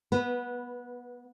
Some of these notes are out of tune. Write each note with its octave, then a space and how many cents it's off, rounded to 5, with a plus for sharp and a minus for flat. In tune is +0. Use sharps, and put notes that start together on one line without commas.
B3 -20 B4 +0